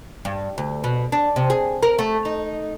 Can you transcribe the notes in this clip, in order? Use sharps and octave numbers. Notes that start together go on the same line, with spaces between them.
G2
D2
B2
D4
C3
G#4
A#4
A3
D#4